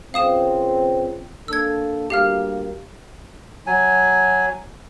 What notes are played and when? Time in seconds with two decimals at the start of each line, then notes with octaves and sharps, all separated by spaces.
0.14 C#2 C4 F5 D#6 E7
1.48 A#3 D4 A4 E6 G#6
2.10 D2 G3 A#3 G4 F5 F6
3.67 F#3 G#5